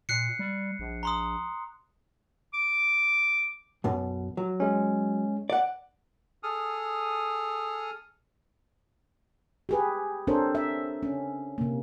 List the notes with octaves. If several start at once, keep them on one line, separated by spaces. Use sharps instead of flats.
A#2 F#6 C7 C#7
G3
A#1
A#5 C6 D#6
D6
B1 F#2 B2
F#3
G#3 C#4
D5 F#5
G#4 A4 D#6 F6
G4 G#4 B4
C4 D4 A4 A#4 C5 C#5
E5
C#4
C3 A#3